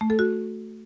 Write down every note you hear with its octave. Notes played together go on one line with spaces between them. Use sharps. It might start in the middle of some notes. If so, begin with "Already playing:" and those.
A3
A4
F#4